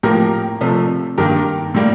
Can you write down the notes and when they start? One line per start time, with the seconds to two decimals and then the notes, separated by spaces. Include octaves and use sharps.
0.03 A2 F3 A#3 G4 A#4
0.61 C3 F3 A3
1.18 G2 D#3 A#3 G4 A#4
1.74 A2 G3 A#3